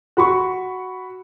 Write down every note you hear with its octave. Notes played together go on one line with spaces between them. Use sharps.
F#4 B5 C#6